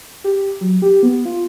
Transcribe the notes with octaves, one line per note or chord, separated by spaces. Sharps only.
G4
F#3
G4
B3
F4